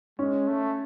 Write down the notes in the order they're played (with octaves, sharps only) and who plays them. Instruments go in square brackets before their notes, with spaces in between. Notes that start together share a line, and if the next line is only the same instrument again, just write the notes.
[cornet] G#3 [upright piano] C#4
[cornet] A3